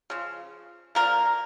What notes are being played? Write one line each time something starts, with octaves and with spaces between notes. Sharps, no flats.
C#3 F3
D3 F3 A#3 A#4